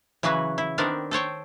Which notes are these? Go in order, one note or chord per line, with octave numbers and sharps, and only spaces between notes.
C#3 E3 F#3 F#4 B4
E4
D#3 B3 C4 D4 A#4 D5
A4 C5 C#5 G5